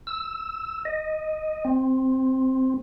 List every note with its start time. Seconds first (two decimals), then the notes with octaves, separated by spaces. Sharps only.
0.07 E6
0.85 D#5
1.65 C4